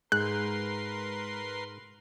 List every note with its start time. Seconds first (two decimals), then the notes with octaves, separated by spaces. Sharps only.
0.12 G#2 G#3 A#4 B4 C6 F#6